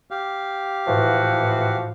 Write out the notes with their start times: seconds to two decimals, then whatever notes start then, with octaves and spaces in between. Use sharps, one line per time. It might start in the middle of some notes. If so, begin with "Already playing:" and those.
0.11 G4 F5
0.87 A2 E3 F3 F#4